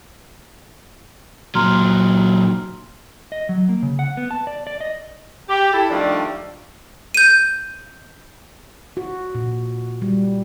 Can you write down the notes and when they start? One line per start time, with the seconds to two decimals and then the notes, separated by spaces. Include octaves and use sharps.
1.55 A#2 F#3 A#5 C6 F6
3.32 D#5
3.49 F#3
3.69 A#3
3.83 C#3
3.99 F#5
4.17 B3
4.31 A5
4.47 D5
4.67 D5
4.81 D#5
5.48 G4
5.73 E4 A4
5.90 D#3 F3 G3 A3 D4 D5
7.14 G6 D#7
8.97 F#4
9.35 A#2
10.02 G3